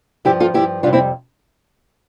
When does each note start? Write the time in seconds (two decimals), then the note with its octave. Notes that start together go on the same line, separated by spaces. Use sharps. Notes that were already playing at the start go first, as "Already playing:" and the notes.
0.25 G2 F3 E4 G4
0.40 F4 A4
0.54 G2 F3 E4 G4
0.83 F2 C3 G3 D4 F4
0.93 C4 E4